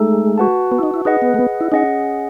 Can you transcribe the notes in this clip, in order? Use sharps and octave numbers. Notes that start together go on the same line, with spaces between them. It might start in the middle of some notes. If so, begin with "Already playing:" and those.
Already playing: G#3 A3 D#4 A4
F#4 B4 F#5 A5
B3
E4
D#4
E4
D#4 G#4 B4 D#5 F#5
B3
A3
B3
E4
C#4 D#4 G#4 D#5 F#5